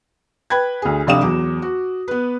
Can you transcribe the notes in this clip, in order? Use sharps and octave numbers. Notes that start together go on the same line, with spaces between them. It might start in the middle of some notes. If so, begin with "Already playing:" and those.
B4 G5 B5 G#6
D2 G#4
F1 C3 D4 F5 D#6 E7
E2 F#3 D6
F#4
B3 B4